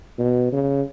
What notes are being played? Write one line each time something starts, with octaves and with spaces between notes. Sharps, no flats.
B2
C#3